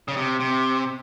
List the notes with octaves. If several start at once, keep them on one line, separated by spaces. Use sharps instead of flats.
C#3
C3
C3